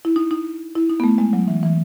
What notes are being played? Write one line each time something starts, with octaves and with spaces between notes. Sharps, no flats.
E4
D#4
D#4
E4
D#4
B3
A3
G#3
F#3
E3
E3